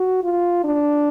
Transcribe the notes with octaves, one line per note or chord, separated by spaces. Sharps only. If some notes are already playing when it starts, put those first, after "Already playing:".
Already playing: F#4
F4
D4